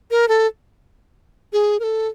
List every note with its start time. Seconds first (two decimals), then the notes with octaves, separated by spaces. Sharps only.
0.11 A#4
0.28 A4
1.53 G#4
1.80 A#4
1.84 A4